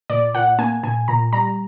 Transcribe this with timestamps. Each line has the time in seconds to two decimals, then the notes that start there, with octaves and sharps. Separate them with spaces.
0.10 A#2 D5
0.34 A#2 F#5
0.59 A#3 G#5
0.83 A#2 G#5
1.08 A#2 A#5
1.33 G3 A#5